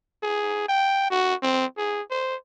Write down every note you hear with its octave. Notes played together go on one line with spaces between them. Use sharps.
G#4
G5
F#4
C4
G#4
C5